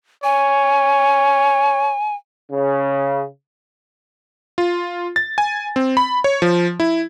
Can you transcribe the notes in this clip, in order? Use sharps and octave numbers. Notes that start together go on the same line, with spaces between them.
C#5 G#5
C#3
F4
A6
G#5
C4
B5
C#5
F3
E4